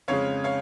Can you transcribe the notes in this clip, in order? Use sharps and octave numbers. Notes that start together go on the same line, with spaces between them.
F2 C#3 G#3 C#5 F5
C#5 F5